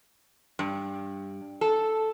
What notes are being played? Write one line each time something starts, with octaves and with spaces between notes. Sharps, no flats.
G2
A4